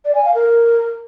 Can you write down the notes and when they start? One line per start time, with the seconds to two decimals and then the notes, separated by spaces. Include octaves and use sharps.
0.05 D5
0.15 G#5
0.25 F5
0.34 A#4